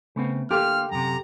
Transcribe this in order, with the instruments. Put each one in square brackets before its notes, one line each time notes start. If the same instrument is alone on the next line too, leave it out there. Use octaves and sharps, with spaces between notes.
[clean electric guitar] C#3 C4 [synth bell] A3 B3
[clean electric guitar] D3 A#3 F4 [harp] G4 [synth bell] A4 D6 [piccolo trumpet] F6
[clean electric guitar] F#2 C3 [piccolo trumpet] A#5